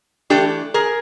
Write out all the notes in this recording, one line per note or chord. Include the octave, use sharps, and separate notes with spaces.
E3 A3 D4 G4 A4
G#4 A#4